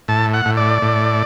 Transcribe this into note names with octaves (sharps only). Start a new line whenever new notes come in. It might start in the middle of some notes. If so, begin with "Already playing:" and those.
A2 A5
F#5
A2
D5
A2